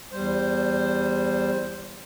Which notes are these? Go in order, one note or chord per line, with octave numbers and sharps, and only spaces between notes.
E2 G3 C5